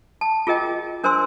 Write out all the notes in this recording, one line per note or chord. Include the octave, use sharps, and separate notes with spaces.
A5
F4 G#4 A#4 D#5 G5
D4 A#4 C5 G#5 C6 E6